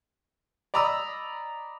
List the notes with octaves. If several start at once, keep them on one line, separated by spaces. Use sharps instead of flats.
D5 D#5 A#5 B5 D#6 E6